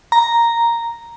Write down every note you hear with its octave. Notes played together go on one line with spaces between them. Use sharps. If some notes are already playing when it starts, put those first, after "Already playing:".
A#5